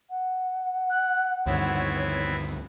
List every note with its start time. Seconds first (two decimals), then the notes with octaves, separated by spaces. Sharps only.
0.10 F#5
0.90 F#6
1.46 D2 G2 D#3 B3 C4 E4 C#5